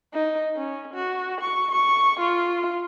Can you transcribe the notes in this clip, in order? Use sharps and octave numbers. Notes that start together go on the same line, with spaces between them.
D#4
C#4
F#4
C#6
C#6
F4